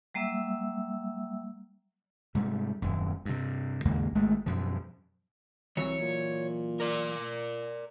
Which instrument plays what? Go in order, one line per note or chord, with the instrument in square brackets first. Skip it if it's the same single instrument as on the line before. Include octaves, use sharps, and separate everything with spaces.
[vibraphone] F#3 G3 A#3 E5 E6
[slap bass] G#2 C3 G3
D#1 F#2
G2 C3
D#2 G#2 C#3 A#3
G#1 G#3 A3
F#2 B2 F3
[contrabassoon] C2 [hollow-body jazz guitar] E3 F#3 [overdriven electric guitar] C#5
[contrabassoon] A#2
[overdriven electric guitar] A#4 D5